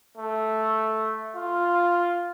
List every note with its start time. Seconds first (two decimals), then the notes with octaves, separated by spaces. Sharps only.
0.17 A3
1.36 F4